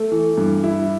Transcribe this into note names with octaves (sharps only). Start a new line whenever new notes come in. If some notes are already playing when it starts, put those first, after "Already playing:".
Already playing: A3 A4
E3
G2
E4